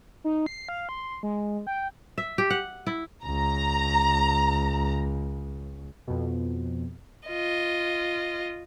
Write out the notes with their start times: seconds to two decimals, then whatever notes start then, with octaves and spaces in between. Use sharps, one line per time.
0.24 D#4
0.46 C7
0.69 F5
0.89 C6
1.23 G#3
1.67 G5
2.18 E5
2.38 G4
2.50 F#5
2.87 E4
3.24 C#2 A#5
6.07 F2 B2
7.27 F4 D#5